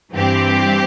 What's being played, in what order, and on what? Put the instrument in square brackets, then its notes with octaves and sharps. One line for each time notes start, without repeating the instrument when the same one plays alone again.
[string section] G2 E3 C4 G4